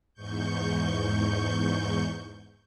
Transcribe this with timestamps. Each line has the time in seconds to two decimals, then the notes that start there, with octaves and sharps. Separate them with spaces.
0.14 E2 G#2 C#6 G6